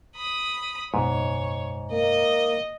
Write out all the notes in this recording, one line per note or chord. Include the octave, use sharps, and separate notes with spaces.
B5 D#6
F#1 B1 G#2 C#5
A#3 D#5